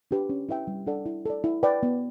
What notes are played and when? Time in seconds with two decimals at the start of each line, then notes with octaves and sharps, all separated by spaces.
0.11 D4 G4 B4
0.29 C#4
0.49 E4 B4 E5 G5
0.67 G3
0.86 D4 A4 D5 F#5
1.06 E4
1.26 A4 D5
1.44 E4
1.63 B4 D5 G5
1.83 B3